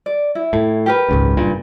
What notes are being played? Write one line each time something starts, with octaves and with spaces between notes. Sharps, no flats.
D5
E4
A2
G4 A#4 B4
G#1 C#2 F#2
F#1 G2 A#2